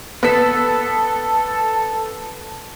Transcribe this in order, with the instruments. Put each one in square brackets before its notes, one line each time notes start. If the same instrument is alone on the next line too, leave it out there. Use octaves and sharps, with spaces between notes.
[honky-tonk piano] B3 B6 [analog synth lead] A4